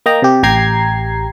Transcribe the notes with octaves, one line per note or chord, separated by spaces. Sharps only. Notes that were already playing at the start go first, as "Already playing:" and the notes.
A#3 D#5 G5 A#5
C3 G4
A1 G4 G5 A#5 G#6 C7